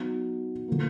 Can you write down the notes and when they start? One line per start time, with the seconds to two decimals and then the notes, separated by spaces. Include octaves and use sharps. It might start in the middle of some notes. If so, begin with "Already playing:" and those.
Already playing: F#3 B3 D#4 F#4
0.68 D3 F3 A#3